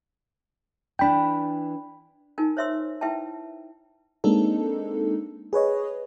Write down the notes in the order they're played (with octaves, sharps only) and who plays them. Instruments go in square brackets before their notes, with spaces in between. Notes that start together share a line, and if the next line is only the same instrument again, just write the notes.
[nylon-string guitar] E3 D4 [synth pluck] G5 B5
[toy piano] D#4 F4 A#4 G#5
C5 C#5 E5 C6 E6
E4 B4 E5 G5 A5
[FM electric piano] G#3 A#3 C4 D4 D#4 A4
G#4 B4 C#5 D#5